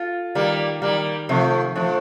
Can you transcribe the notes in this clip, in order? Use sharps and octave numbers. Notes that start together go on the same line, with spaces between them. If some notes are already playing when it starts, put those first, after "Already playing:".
Already playing: F4 A4
D#3 G3 A#3
D#3 G3 A#3
C3 F3 A3
F3 A3 D4